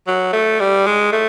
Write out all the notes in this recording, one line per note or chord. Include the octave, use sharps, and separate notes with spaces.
F#3
A3
G3
G#3
A3